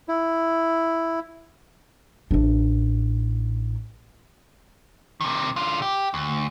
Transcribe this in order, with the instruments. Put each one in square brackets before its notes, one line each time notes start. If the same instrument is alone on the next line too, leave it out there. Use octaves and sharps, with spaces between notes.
[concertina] E4
[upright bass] A1 D4
[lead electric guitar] C3 D#3
D3 F4
G4
D2